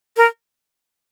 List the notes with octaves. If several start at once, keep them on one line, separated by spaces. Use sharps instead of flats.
A#4